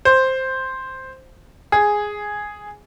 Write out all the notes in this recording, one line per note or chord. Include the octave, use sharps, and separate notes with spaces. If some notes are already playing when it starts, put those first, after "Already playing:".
C5
G#4